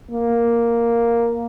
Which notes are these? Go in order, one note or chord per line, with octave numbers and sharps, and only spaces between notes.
A#3